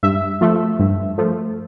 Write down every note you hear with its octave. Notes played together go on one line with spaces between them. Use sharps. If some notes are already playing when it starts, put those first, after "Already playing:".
G2 E5
F3 A3
G2
F3 A3